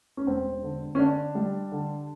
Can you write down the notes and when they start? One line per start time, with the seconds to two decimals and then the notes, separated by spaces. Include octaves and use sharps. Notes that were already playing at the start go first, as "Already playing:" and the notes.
0.17 C#4
0.27 E1 C4
0.63 D3
0.95 C#4
0.99 D3 D4
1.35 G3
1.72 D3